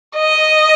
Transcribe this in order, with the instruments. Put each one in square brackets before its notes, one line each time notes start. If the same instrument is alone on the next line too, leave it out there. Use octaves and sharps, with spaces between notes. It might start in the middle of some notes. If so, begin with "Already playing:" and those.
[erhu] D#5